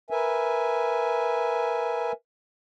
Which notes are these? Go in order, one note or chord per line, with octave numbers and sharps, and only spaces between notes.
A#4 B4 E5 G#5